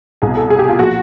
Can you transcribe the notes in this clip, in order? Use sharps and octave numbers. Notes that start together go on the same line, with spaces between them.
C2 B2 G#4
A4
G#4
G4
F4
A#2 F3 F#4